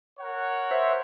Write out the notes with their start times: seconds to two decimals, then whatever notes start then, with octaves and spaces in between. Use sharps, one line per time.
0.20 A#4 C#5 F#5
0.71 C5 E5